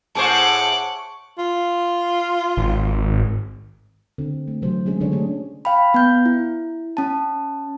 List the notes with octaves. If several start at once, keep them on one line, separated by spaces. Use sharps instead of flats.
A2 G#4 C5 F#5 A5 C#6 D6
F4
G#1
D3 C4
A3
C3 E3 F#3 C5
G#3 C#4 D4 G#4
D3 F#3 D4 G#4 C#5
A3 C#4 G4 G#4
F5 G5 B5
B3 G6
E4
C#4 A5